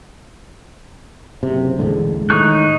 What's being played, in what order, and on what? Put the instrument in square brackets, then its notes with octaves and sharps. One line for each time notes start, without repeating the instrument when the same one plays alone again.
[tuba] F#1 [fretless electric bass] C3
[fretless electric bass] E1 A1 D3 [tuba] G#3
[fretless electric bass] A2 [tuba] D#3 [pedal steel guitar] D#4 C#6 F#6